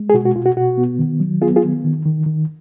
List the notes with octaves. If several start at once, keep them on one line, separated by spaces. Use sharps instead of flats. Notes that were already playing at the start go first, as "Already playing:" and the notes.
Already playing: G#3
G#4
B2 F#4
F#4
B2 F4
F#4
B2 F#4
B3
D#3
F#3
B3 F4 G#4
F4 G#4
D#3
D#3
D#3
D#3